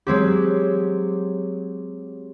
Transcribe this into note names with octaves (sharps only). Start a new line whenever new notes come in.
F#3 G#3 C4 G4